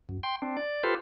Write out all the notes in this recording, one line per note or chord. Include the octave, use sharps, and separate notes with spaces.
F#2
G5 C6
C4 D4
D5
F4 G4 A4 B4 C5